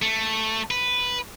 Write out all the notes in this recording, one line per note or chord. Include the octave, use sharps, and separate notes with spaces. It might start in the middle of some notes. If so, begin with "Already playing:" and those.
A3
B4